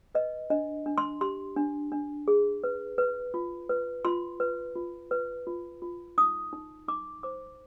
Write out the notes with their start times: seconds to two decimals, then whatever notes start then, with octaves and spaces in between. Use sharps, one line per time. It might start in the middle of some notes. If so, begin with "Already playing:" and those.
0.15 B4 D#5
0.50 D4 D#5
0.86 D4
0.98 C6
1.21 G4 C6
1.56 D4
1.92 D4
2.28 G#4
2.64 B4
2.98 B4
3.34 F4
3.69 B4
4.05 F4 C6
4.40 B4
4.76 F4
5.11 B4
5.47 F4
5.82 F4
6.18 D#4 D#6
6.53 D#4
6.88 D#4 D6
7.23 C5 D6